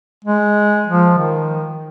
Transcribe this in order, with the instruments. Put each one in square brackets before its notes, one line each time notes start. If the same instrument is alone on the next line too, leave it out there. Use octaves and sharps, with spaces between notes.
[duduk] G#3
F3
D#3